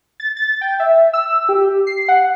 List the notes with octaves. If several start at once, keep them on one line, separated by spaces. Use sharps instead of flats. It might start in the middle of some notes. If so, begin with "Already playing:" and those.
A6
A6
G5
E5
E6
G4
C7
F#5